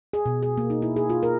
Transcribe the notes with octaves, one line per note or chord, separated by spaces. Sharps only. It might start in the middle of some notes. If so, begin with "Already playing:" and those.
G#4
B2
G#4
A#3
D#4
E4
G#4
F4
A#4